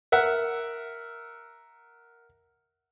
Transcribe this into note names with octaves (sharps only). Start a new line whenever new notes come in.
A#4 E5 F#5